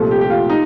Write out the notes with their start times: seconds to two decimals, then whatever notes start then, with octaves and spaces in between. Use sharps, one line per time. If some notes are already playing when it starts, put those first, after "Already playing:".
Already playing: C2 A#2 F3 A3 A4
0.11 G4
0.21 G4
0.30 F4
0.50 D#4